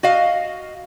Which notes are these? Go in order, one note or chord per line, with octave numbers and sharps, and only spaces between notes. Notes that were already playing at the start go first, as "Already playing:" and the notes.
F#4 D#5 F5